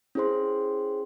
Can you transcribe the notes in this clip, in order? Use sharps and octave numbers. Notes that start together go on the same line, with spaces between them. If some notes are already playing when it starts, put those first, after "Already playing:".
C#4 E4 G#4 C5 C6